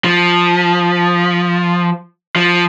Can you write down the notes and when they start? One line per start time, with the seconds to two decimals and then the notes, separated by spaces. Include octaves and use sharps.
0.04 F3
2.36 F3